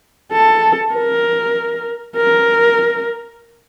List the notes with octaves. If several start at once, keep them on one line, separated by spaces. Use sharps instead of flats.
A4
A#4
A#4